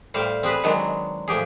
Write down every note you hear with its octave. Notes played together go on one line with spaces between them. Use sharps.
A2 G3 C5 F5
C4 G#4 B4
D#3 F#3 G#3 D4
A2 F3 G4 G#4